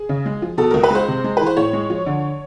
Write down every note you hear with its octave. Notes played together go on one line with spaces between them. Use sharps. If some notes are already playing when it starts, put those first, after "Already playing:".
Already playing: G#4
C#3
G#3
F3
B2 A4
C#2 A#4
B4
G#3 C5
C3
G#3
E3 B4
C5
A2 C#5
G#3
F3
D3